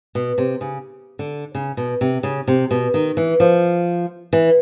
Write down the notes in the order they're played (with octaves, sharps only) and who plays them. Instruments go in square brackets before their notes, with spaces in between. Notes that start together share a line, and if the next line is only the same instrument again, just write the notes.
[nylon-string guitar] B2
C3
C#3
D3
C#3
B2
C3
C#3
C3
B2
D#3
E3
F3
E3